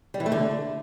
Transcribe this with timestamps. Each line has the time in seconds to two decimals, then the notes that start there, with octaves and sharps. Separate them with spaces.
0.14 G3
0.20 E3
0.26 A3
0.32 D3